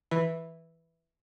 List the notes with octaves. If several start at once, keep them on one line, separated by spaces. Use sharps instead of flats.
E3